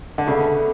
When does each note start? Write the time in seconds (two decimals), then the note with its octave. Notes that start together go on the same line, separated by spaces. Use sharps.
0.18 D3
0.27 C#3 B3 D4 A4 E5